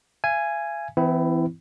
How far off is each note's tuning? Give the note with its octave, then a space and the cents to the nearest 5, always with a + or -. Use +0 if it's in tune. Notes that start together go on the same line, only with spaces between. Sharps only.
F5 -45 G#5 +0
E3 +0 C4 -40 E4 +5